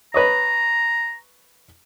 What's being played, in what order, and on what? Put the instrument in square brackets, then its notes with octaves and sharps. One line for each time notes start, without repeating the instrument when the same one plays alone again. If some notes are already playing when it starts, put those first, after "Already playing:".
[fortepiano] B4 C#5 D#5 [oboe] A#5